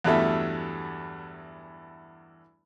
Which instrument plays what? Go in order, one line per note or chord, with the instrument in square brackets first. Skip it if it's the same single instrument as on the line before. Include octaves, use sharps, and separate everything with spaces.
[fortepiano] E2 G2 F#3 A3 E4 E5